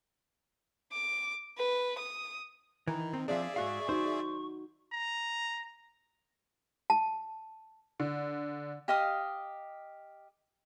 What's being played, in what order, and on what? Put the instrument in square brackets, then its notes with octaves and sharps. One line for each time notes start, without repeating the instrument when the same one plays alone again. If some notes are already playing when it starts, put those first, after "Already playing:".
[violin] D6
B4
D#6
[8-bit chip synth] D#3 [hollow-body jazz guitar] E3 [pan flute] A#5
[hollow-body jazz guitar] C4
[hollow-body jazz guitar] F3 C4 D4 [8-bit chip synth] G#4 D5 E5 [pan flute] F5
[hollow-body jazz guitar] G#2 F#4 F5 [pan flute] C#6
[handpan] D#4 F#4 [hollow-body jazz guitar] C5
[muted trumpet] A#5
[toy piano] A5
[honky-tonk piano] D3
[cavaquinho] G4 D#5 F5 D#6